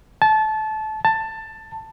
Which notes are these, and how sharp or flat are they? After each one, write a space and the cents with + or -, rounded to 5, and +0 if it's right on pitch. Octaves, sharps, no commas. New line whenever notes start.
A5 -20
A5 +15